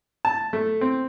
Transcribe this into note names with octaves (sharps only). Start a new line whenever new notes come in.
A5
A3
C4